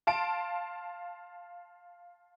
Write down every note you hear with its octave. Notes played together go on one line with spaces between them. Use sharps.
F5 A5 C6 D7